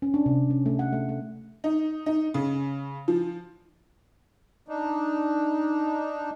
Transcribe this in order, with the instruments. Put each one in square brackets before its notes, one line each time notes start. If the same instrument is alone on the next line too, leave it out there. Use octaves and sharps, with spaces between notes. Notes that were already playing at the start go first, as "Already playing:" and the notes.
[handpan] C#4
D4
C3
C#4
A3
F#5
A3
A3
[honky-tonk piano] D#4
D#4
C#3
F3
[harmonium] D4 D#4